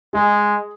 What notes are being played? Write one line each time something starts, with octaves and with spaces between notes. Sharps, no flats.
G#3 G#4